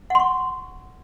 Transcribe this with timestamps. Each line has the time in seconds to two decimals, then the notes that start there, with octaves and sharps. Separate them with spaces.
0.10 F#5
0.15 C6
0.20 C#6